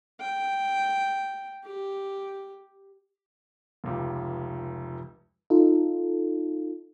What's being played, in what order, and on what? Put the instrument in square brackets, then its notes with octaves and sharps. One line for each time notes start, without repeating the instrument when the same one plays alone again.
[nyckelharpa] G5
G4
[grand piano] F1 C#2 G4
[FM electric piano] D#4 F4 A4